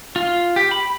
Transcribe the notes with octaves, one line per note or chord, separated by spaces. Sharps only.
F4
G4
B5